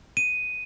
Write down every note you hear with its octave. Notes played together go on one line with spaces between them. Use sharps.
D#7